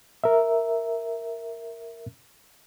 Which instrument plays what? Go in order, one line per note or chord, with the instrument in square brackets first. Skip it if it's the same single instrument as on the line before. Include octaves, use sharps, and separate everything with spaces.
[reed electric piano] A#4 E5